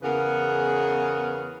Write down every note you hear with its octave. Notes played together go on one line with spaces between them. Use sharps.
E2 C#3 B3 G#4 A#4 B4